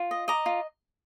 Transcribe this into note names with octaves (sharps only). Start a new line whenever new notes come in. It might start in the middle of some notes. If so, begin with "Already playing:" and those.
Already playing: F4
D#5
D#5 A#5 D6
F4